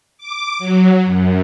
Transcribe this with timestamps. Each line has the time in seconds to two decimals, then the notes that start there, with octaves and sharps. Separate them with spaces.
0.18 D6
0.59 F#3
1.05 F#2